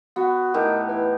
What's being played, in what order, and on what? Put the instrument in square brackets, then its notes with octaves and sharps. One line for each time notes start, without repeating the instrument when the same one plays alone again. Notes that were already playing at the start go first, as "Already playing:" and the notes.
[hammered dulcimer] B3 [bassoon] F#4
[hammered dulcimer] A2 D#4 G4 [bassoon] D#3
[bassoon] E3